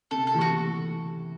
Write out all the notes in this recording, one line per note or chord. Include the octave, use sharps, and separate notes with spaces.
C3 A4
A4
E3 A3 E4 G4
F#4